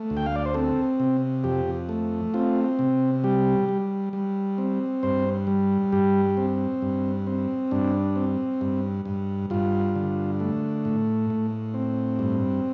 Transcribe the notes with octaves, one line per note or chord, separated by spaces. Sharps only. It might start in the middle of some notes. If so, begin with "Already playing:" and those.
Already playing: A3
D2
G5
F5
D5
C5
C4 A4
C3
F2 G4
A3
C4 F4
C3
G3 G4
G3
G3
C4
G2 C5
G3
G2 G4
C4
G2
C4
G2 D4
C4
G2
G2
G2 F4
D3
A3
A2
A2
C4
G2